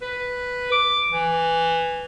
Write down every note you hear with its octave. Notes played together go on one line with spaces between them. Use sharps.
B4
D6
E3